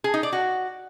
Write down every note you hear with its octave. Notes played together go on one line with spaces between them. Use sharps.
G#4
D#4
D5
F#4